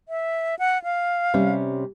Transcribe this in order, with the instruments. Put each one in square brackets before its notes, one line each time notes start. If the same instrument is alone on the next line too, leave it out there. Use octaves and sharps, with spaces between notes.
[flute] E5
F#5
F5
[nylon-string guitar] C3 G3 C#4